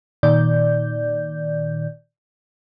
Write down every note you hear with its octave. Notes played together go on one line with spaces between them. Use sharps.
A#2 D#3 D5 G6